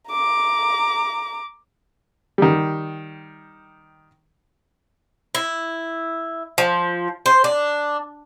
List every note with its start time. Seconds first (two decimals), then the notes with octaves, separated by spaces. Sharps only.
0.11 A#5 D6
2.38 D#3 G3
5.35 E4
6.58 F3
7.26 C5
7.44 D4